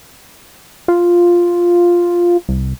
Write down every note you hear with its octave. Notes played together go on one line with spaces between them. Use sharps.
F4
C2